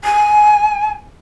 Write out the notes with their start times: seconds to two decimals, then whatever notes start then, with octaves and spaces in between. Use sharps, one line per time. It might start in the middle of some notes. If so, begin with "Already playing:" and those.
0.04 G#5